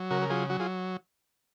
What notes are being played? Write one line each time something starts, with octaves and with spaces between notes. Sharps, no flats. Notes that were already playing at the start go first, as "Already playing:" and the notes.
Already playing: F#3
C#3 F#4 A#4
A#4
F#3 F4 G#4
F#3 F#4
F4 G#4